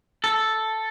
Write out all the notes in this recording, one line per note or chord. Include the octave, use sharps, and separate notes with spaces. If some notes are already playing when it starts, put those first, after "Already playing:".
A4